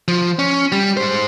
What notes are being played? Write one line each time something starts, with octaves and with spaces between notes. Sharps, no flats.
F3
C#4
G3
G#3 C5